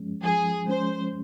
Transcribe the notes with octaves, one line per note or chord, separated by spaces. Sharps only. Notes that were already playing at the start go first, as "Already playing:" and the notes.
Already playing: F3 G#3 C#4
F3 G#4
G#3 C#4 C5